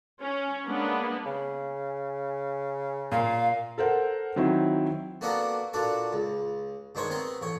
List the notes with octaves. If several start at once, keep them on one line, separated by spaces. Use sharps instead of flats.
C#4
G#3 A#3 B3 D4
C#3
A#2 F5
A4 A#4 C5 F#5
D#3 F#3 C4 E4
A#3 B3 D4 F#4 A4 A#4
A#2 D4 F#4 A4
C#2
G2 D#3 G#3 C5 C#5 C#6
B3 C4 A#4 C6
A1 C#5